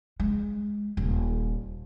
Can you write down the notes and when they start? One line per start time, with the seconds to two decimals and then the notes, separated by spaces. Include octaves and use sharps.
0.20 G#3
0.97 D#1